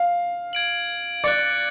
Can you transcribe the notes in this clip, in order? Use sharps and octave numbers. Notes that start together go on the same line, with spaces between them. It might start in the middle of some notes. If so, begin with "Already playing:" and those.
Already playing: F5
G#6 D7 F#7
D5 F#6 A6 C#7